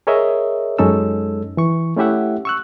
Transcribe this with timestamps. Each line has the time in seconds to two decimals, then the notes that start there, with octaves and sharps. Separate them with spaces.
0.07 G#4 A#4 C#5 D#5 E5
0.79 F#2 G#3 C#4 D#4 A4 E6
1.57 E3 C#6
1.96 A3 C#4 E4 G4 E5 F#5
2.45 C#6 E6 F#6